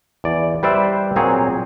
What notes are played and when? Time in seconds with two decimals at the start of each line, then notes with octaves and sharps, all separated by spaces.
0.24 E2 D5
0.63 G3 B4 C5 D5 E5
1.16 A#2 F#3 C4 G#4 C#5